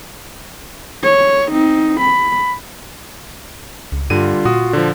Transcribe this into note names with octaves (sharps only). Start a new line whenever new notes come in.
C#5
C4 D#4
B5
C#2
G2 D3 G3 F4 D#7
A#2 F#4 D#6
D3 F3